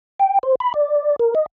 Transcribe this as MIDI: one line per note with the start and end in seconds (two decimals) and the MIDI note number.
0.20 0.39 79
0.43 0.55 72
0.60 0.73 83
0.74 1.16 74
1.20 1.34 70
1.35 1.46 75